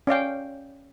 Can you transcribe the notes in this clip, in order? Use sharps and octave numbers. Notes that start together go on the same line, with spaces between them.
C#4 D5 F5 G5